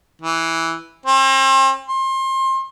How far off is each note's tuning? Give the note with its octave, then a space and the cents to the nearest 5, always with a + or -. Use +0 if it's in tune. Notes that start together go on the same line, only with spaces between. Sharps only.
E3 -5
C4 +40
C6 +30